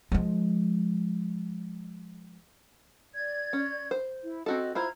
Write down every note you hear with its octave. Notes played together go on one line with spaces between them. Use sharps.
F3 G#3
D5 G#6
C#4
C5
E4
C4 F#4 A4 D#5
E4 F4 C5 A#5 G#6